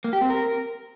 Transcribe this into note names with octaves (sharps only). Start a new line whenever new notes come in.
A#3
G4
C4
A#4